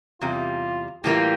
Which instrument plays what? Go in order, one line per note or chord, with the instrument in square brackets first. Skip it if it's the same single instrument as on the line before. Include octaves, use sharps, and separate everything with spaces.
[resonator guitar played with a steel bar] E2 C3 G3 [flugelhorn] F4
[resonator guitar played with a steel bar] A2 E3 G3 A#3 F4 [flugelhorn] G4